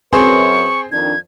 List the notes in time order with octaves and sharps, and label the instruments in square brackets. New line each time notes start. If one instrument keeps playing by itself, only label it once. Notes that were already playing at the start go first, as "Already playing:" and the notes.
[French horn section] F#2 B4 [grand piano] C4 G#4 C5 [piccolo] C#6
[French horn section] F2 D#3 D4 [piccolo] G#6